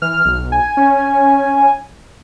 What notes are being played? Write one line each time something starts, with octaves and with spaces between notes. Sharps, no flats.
E3 F6
B1
G#5
C#4